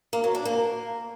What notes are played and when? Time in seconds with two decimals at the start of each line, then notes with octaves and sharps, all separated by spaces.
0.13 A#3
0.24 F#3
0.35 D4
0.45 A#3